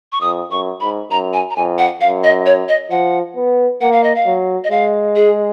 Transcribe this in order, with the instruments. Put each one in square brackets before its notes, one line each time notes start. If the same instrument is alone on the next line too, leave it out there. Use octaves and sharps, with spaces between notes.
[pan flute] C#6
[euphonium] F2 [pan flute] D#6
[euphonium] F#2 [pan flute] C#6
[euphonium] G#2 [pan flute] B5
[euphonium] F#2 [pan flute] A#5
[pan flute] G#5
A#5
[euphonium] F2 [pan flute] G#5
[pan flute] F#5
[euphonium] F#2 [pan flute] F5
[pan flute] D#5
C#5
D#5
[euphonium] F3 [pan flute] F#5
[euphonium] B3
[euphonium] A#3 [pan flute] F#5
[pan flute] F5
D#5
F5
[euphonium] F#3
[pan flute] D#5
[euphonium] G#3 [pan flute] F5
[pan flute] G#4